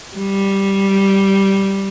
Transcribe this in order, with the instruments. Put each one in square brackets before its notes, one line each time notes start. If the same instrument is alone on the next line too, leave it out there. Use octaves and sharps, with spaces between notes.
[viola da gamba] G3